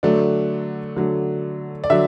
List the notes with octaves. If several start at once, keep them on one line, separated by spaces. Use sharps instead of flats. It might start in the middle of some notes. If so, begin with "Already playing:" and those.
D3 F#3 A3 D5
D3 F#3 A3
D5
D3 F#3 E5